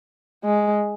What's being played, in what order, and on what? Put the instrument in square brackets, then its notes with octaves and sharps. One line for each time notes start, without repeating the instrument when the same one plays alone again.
[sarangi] G#3